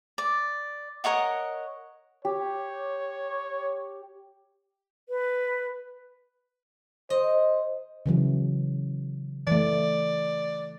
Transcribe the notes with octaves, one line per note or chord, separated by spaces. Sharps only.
D5
A#4 C#5 D#5 F#5
G4 C#5
B4
C5 D#5
C#3 E3 F#3
E3 A3 D5